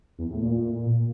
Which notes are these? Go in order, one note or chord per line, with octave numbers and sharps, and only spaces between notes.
E2
A2
A#2